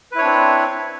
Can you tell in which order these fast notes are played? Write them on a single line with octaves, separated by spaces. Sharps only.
B4 E4 C#5 D4 C4